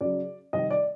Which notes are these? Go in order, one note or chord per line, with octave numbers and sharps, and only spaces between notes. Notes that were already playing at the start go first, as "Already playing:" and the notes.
C#3 F#3 D5
C3 D#3 G3 D#5
D5